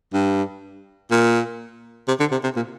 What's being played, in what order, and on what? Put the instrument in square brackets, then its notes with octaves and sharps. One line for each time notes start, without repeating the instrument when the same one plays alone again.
[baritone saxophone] G2
A#2
C3
D3
C3
C3
A#2